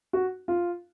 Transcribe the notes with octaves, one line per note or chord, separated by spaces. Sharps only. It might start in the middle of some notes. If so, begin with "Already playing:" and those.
F#4
F4